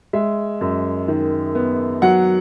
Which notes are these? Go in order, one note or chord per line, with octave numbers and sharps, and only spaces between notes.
G#3 E5
F#2
D#3
B3
F#3 F#5